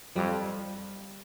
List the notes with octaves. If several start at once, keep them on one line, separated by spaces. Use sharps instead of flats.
F2 G3